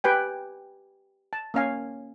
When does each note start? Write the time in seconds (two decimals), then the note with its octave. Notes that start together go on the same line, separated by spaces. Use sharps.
0.04 G4 B4 G5 G#5
1.33 A5
1.54 A#3 C#4 F5 G#5